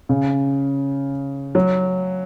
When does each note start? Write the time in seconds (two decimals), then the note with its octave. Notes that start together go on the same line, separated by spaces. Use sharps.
0.09 C#3
1.55 F#3